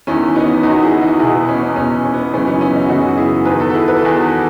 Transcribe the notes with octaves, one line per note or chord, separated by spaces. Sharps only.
E2 D#3 C#4 E4
B3 D#4
E2 D#3 D#4 F#4
E4 G#4
D#4 F#4
E2 B2 E4 G#4
B3
C#4
C#4
E2 B2 C#4
C#4
B3
F#2 C#3 E3 C#4
B3 D#4
C#4 E4
D#4 F#4
F#2 C#3 E3 D#4 F#4
F#4
E4 G#4
E2 D#3 G#4 B4
F#4 A4
A4
E4 G#4
B4
A4
E2 D#3 G#4
F#4 A4